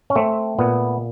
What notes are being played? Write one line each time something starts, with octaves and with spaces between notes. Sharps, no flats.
C#4
A3 C4
A#2 B3